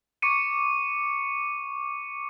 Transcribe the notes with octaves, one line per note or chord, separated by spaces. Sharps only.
C#6 D6 C#7 D#7